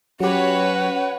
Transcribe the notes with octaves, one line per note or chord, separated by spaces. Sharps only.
F#3 C#4 F#4 G4 B4 C#5 F#5